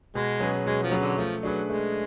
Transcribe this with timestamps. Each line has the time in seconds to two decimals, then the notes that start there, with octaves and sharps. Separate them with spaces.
0.15 B2 G#3
0.40 F#3 C#4 G#4 B4
0.66 B2 G#3
0.83 F3
0.92 F#3 C#4 G#4 B4
1.01 D3
1.18 F3 A3
1.43 F#3 D4 G#4 B4
1.69 G#3 A3